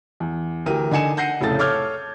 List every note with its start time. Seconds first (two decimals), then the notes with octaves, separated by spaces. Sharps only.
0.20 E2
0.66 D2 E3 G4 A#4 D#7
0.91 D3 D#4 G#5 C#7 E7
1.17 F#5 G6 A#6 C7 C#7 D#7
1.41 F1 A2 C#3 A4 A6
1.59 A4 C#5 D6 F6 G6 G#6